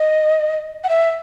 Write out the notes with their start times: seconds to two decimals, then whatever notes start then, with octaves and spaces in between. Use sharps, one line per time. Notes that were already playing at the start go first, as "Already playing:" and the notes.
Already playing: D#5
0.84 F#5
0.89 E5